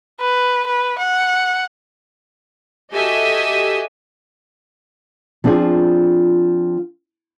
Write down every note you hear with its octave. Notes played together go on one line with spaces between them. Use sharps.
B4
B4
F#5
F#4 G4 A4 D#5 E5 G#5
F3 C4 D4 F4 G#4